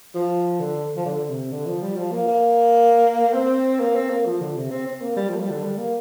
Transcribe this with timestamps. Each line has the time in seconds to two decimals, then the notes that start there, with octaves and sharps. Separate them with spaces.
0.15 F3
0.60 D3
0.97 F3
1.05 D3
1.29 C3
1.52 D3
1.66 F3
1.82 G3
1.97 F3
2.12 A#3
2.27 A#3
3.34 C4
3.80 A#3
3.95 C4
4.10 A#3
4.25 F3
4.41 D3
4.56 C3
4.71 C4
4.86 C4
5.01 A#3
5.17 G3
5.29 F3
5.36 A#3
5.40 G3
5.51 D3
5.63 G3
5.78 A#3